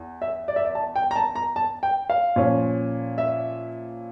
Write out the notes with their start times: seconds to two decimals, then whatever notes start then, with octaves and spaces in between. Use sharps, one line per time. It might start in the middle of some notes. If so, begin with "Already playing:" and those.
Already playing: E2
0.22 E5
0.48 D5
0.56 E5
0.65 D5
0.75 A5
0.96 G5
1.11 A#5
1.16 A5
1.35 A#5
1.56 A5
1.83 G5
2.10 F5
2.36 A#2 F3 C#4
3.18 E5